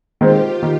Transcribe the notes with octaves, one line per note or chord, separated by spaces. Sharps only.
D#3 G#3 C4 F4 G4
D#3